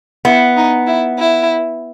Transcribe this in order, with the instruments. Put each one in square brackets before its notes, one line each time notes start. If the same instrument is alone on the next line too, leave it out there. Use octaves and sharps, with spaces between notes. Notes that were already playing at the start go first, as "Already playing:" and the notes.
[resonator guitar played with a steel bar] B3 [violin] E4
[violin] D#4
E4
E4